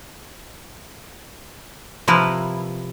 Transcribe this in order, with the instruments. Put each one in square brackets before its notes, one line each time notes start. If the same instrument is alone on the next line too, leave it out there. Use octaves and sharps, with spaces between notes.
[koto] C3 F3 E4 A#4 B4